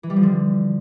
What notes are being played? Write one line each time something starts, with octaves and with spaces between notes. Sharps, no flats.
E3
G3
F3
D3